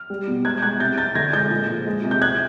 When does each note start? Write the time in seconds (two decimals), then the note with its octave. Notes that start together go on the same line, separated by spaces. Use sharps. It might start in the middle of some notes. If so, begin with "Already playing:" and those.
Already playing: F6
0.10 G3
0.28 B2
0.45 G#3 F#6 G#6
0.58 G6
0.62 G#3 F#6 G#6
0.80 C3 G6 A6
0.98 C3 G6 A6
1.15 D3 G#6 A#6
1.33 G#3 G6 A6
1.50 A#2
1.68 F3
1.87 G#3
2.03 C3
2.11 G6
2.21 C3 F#6 G#6